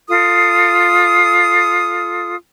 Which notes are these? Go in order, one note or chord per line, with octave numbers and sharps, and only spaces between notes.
F4 A4 D#6